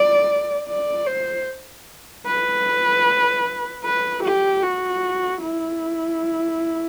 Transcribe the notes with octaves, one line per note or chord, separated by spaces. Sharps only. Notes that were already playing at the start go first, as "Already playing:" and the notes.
Already playing: D5
D5
C5
B4
B4
G4
F#4
E4